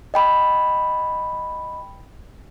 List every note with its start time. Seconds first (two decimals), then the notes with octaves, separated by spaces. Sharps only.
0.14 D#5 G5 B5